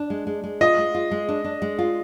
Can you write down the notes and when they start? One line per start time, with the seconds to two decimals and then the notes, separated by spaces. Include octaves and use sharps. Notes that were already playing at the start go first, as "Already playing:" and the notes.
Already playing: D4
0.10 G#3
0.27 G#3
0.44 G#3
0.61 F4 D#5
0.78 G#3
0.95 F4
1.11 G#3
1.29 D4
1.44 D4
1.62 G#3
1.79 F4